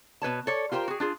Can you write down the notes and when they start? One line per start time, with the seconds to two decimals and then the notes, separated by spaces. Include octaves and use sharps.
0.22 B2 B4 C#5 A5
0.47 A4 C#5 D5
0.72 F4 G4 A#4 C5 G5
0.88 F#4 G#4
1.00 D4 F4 G#4